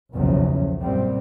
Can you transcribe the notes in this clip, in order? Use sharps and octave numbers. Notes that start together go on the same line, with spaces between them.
F#1 B1 E2 C#3 F3 F#3
F#2 A#2 G3 C4